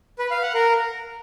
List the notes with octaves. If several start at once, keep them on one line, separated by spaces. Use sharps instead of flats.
B4
F5
F#5
A#4